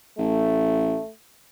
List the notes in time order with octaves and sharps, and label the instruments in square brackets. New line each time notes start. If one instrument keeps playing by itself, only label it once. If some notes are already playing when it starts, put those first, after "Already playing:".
[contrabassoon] A1 [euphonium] A3